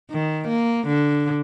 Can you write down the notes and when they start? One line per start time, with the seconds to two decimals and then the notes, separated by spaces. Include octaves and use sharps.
0.11 D#3
0.48 A#3
0.87 D3